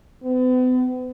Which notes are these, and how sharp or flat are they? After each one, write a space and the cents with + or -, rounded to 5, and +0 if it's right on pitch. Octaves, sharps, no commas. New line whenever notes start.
B3 +45